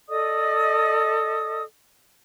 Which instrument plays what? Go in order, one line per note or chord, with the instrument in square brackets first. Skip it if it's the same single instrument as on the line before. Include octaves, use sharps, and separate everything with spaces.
[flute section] A4 D5 D#5 D#6